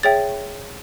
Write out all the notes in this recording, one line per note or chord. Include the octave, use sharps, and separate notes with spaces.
G#4 C#5 E5 G5 A6